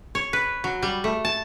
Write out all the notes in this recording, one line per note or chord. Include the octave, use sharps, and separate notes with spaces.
C#5
B4
F#3
G3
A3
A5